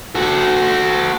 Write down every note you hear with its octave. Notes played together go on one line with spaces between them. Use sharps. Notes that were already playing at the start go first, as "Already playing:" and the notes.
F#4 A4